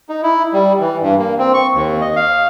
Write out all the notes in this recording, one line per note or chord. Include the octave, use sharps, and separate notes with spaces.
D#4
E4
G3
E3
G2
A#3
C4
C#6
D#2
D#5
F5